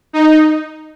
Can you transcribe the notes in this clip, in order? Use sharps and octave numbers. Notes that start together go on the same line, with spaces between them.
D#4